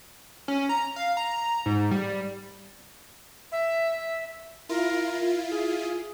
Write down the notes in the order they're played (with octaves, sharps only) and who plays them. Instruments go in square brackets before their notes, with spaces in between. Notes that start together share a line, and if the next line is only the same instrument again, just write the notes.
[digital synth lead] C#4
A#5
F5
A#5
G#2
G3
[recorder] E5
[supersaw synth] E4 F4 [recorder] A#4
[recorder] G#4